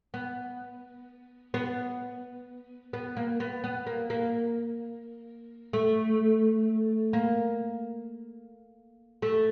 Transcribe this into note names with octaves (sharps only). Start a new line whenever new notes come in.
B3
B3
B3
A#3
B3
B3
A#3
A#3
A3
A#3
A3